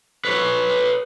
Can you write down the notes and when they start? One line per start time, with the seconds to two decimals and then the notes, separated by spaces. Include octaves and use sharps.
0.25 B4 C#5